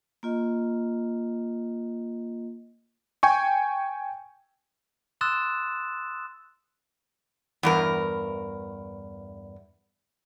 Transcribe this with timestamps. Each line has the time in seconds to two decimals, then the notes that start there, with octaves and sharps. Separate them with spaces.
0.23 A#3 F4 D#5
3.23 G5 G#5 C#6
5.21 C6 D#6 E6 F#6 A6 E7
7.63 E2 G2 A#4